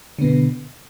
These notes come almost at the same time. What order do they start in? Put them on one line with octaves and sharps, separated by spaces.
D3 B3 B2